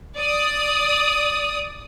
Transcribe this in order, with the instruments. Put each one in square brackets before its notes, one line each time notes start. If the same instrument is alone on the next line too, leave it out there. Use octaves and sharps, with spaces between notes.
[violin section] D5 D#6